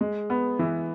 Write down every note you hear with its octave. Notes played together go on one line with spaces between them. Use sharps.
G#3
B3
E3